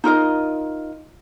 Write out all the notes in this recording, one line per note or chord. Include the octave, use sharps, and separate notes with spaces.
D#4 F4 A#4 D#5